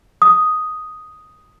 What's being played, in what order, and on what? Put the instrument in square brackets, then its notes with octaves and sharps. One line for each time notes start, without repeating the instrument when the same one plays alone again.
[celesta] D#6